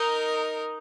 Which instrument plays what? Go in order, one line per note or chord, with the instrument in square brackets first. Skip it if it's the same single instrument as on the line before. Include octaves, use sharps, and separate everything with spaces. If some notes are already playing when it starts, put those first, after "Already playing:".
Already playing: [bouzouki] D#4 [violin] A#4